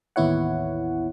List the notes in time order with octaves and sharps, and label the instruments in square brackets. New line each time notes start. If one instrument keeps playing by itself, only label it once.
[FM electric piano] A1 D#2 B3 E4 C#5 F#5